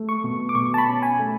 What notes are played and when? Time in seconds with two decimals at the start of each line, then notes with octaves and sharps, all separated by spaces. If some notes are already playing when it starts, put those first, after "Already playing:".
Already playing: A3
0.09 C#6
0.24 B2
0.49 D6
0.55 B2 C#6
0.74 A5
0.78 B5
0.86 C#4
1.03 G#5
1.19 A3